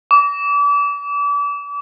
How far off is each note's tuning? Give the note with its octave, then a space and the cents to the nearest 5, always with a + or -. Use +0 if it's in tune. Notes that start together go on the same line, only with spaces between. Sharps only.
D6 -35